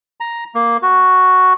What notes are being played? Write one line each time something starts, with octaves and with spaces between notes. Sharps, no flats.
A#5
A#3
F#4